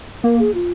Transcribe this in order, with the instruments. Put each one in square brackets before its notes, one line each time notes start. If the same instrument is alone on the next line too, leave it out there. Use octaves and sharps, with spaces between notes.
[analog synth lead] A#3 [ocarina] A#4
[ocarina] G#4
F4